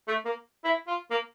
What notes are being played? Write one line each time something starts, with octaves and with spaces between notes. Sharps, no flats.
A3
A#3
E4
F4
A#3